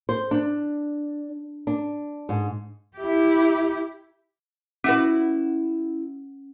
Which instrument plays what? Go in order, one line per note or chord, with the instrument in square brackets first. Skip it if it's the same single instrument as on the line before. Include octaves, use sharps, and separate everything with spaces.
[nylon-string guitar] C5
D4
D4
G#2
[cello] E4 G4
[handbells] C#4 [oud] E4 F#4 B4